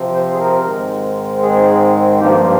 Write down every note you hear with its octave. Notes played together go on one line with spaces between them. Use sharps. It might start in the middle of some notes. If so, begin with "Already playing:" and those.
Already playing: C3 F3 C4
C5
G#4
A#4
G#2 D#3 G#3 C4
G#4
G2 F3 A#3 G4